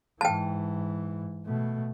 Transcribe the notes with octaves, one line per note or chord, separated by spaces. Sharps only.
G#2 E3 G5 A5
B2 A3